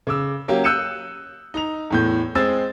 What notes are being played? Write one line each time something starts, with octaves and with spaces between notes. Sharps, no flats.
C#3 D6 E6
F#3 A#3 C#4 G4
E6 F#6 G6 C#7 D#7 E7
D#4 A#5 F7
E2 A2 G6
G#3 C4 G#4 E6 A6